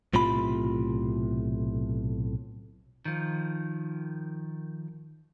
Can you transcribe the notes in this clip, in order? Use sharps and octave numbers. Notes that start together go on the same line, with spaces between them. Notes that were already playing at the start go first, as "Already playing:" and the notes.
B1 A2 C3 F4 B5
D#3 F3